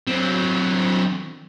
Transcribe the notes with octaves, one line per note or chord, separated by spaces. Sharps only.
F#3 C4